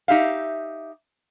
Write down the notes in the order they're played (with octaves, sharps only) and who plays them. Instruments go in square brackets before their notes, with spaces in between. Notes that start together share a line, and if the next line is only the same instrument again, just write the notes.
[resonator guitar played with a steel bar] D#4 G4 E5 F5